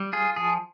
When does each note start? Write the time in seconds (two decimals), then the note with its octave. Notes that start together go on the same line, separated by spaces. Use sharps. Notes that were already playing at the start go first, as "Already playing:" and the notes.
Already playing: G3
0.13 F4 G#4
0.36 F3 G#4